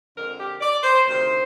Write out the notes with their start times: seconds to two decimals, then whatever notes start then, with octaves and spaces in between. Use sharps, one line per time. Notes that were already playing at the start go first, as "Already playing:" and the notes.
0.16 F2 D3 G#3 A#4
0.38 G4
0.61 D5
0.83 C5
1.06 D2 C3 D#3 C5